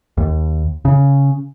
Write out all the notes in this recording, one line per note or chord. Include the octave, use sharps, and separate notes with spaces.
D#2
C#3